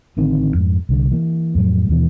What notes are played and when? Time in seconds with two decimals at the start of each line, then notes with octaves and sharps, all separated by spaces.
0.17 A1 D3 D#3 C4
0.54 F2 G#2
0.89 C2 D3
1.11 E3 A#3
1.55 F2 A2 F#3 A3
1.89 D#2 B2 E3